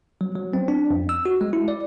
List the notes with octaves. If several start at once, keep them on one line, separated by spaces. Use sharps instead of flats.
F#3
F#3
C4
D4
F2
E6
F#4
G#3
E4
D5